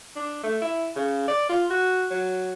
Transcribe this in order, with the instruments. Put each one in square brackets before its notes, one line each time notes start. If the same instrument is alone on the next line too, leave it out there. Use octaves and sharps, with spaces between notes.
[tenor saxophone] D4
A3
E4
C#3
D5
F4
F#4
F#3